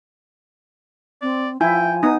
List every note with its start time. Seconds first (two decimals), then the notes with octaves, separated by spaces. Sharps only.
1.22 C4 D5
1.61 F3 E4 G5 G#5
2.03 B3 D#4 D#6